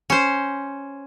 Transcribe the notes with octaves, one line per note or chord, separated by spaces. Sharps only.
C#4 C5